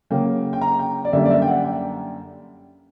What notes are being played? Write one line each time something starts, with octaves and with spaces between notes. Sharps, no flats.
C#3 F#3 A#3 G5
G5
A#5
G5
D5
F#2 D3 G3 A#3 E5
D5
E5
G5
F#5
G5